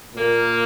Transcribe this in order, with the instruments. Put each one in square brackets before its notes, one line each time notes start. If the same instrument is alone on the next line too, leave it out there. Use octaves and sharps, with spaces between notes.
[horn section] A#2 A#3